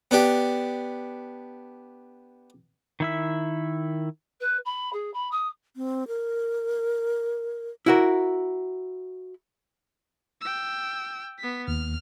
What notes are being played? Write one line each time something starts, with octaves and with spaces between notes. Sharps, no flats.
B3 D4 G4
D#3 E4 E5
B4
B5
G#4
B5
D#6
C4
A#4
E4 F#4 A#4
G5 E6
B3 B6
D#2 F6